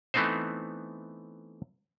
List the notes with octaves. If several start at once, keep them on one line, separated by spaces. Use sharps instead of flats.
E3 A3 B3 C4 D#4 C5